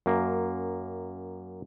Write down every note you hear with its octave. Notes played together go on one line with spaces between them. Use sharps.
F#2 A#3